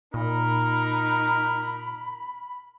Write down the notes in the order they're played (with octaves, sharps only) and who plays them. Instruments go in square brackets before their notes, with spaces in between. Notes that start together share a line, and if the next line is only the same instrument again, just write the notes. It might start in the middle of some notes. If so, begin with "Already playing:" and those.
[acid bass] A#2 [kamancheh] D#4 [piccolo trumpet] A#4 [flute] B5